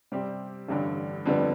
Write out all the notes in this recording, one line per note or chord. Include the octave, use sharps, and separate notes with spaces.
C3 G3 C4 G4
A1 G2 D3
F2 D3 G3 B3